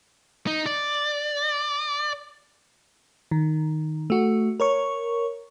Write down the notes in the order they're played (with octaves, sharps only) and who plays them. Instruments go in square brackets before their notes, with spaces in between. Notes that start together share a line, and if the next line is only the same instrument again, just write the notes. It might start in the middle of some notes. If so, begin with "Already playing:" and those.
[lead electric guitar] D#4
D5
[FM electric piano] D#3
A3 F#4
A#4 C#5 C#6